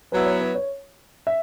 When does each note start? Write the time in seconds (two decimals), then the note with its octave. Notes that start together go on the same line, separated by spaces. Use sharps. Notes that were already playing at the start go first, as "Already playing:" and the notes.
0.12 F#3 B3 E4 B4
0.26 C#5
0.41 B4
0.55 C#5
1.27 E5